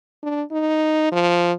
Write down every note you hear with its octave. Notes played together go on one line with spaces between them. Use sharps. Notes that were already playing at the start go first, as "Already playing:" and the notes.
D4
D#4
F3